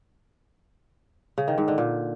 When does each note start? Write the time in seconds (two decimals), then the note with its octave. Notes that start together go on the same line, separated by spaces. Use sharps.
1.38 C#3
1.48 D#3
1.58 G#2
1.68 D3
1.78 A#2